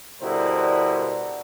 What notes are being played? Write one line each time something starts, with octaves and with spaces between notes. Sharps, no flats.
B2 D3 G3 E4 A#4 C5